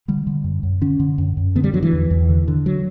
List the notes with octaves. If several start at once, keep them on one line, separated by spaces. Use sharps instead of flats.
D3 G3
D3
F#2
F#2
D3 C#4
D3
F#2
F#2
D3 B3
G3
D3 F#3
E3
E2
E2
D3
D3
F#3